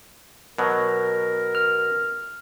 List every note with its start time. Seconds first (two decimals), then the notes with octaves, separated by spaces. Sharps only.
0.58 B2 F#3 A#4
1.55 F6